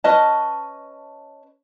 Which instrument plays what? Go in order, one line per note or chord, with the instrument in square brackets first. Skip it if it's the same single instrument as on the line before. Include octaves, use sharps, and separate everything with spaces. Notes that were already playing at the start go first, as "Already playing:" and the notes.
[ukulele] C#4 B4 D#5 A5